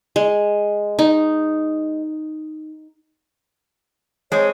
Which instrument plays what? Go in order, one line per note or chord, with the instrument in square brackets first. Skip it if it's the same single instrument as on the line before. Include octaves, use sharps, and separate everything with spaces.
[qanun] G#3
D#4
[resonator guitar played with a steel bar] G#3 C4 [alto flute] C#5